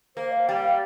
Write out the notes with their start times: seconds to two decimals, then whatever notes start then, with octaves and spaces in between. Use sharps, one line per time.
0.16 A#3 C5
0.32 F5
0.48 G3 G5
0.63 F5